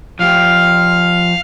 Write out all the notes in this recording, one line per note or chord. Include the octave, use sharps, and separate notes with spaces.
F3 G4 F5